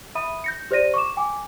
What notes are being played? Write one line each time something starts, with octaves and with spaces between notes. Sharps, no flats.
E5 B5 D#6 D#7
G6 A#6 C#7
G4 C5 D5 A#6 D#7
C#6 D6 E7
G5 G#5 D6